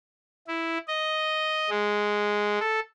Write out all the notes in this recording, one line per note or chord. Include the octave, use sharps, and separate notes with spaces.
E4
D#5
G#3
A4